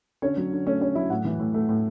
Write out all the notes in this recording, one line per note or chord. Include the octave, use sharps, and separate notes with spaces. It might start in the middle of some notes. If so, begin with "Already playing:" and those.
D3 C#4 C#5
F#3
D3
A3 C#4 C#5
D3 C#4 C#5
F#3 E4 E5
A2 F#4 F#5
E3
A2
A3
A2